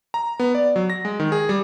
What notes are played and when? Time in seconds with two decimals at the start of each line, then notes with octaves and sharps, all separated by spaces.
0.14 A#5
0.40 B3
0.55 D5
0.76 F#3
0.90 A#6
1.05 G#3
1.20 D#3
1.32 G#4
1.49 G3